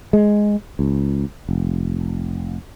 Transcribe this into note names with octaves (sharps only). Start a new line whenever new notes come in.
G#3
C#2
F1